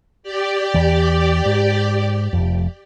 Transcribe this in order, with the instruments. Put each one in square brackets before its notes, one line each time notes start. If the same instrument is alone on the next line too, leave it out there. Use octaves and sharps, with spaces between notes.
[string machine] G4 D5
[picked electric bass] E2 E3
G#2
F1 F2